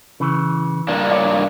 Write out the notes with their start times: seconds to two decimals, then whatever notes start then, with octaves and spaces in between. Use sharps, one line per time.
0.20 C#3 E3
0.88 G2 A#3 D4
1.11 C#5 D5